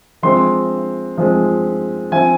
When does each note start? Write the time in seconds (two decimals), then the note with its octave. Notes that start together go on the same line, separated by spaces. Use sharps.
0.23 F3 G#3 C4 C6
1.18 F3 G#3 C4
2.12 F3 C4 G#5